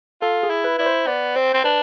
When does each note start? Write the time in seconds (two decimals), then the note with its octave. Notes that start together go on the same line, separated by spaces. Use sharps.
0.22 F4 A4
0.43 G#4
0.50 E4
0.64 B4
0.79 E4 D5
0.86 C5
1.07 B3 D5
1.36 C4 C5
1.54 C4
1.64 D4 B4